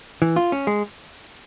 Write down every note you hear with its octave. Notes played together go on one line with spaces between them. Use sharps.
E3
F4
C#4
G#3